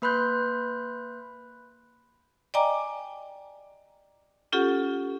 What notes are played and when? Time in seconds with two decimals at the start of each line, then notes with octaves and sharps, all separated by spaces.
0.02 A#3 B4 B5 C6 F#6 G6
2.54 D5 D#5 G5 G#5 A#5 D6
4.52 C#4 F4 G4 A4 F#5